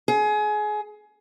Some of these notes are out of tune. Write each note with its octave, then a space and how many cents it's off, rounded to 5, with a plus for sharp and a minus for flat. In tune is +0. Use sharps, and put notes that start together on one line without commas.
G#4 +25